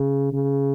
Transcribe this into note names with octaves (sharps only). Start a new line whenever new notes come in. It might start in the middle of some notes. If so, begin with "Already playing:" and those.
Already playing: C#3
C#3